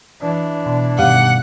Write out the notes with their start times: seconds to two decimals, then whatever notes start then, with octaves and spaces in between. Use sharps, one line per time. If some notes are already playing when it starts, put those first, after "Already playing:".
0.21 E3 D4
0.66 B2
0.98 G2 B2 D#3 G4 F5 F#5 D6